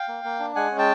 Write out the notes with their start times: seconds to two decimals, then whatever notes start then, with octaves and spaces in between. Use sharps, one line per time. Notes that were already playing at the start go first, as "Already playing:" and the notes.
Already playing: F5 G5
0.08 A#3
0.24 A#3
0.39 D4
0.55 G#3 F#5 G#5
0.71 C#4
0.78 G5 A5